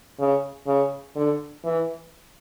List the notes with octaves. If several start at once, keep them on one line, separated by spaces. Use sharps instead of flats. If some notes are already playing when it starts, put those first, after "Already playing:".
C#3
C#3
D3
E3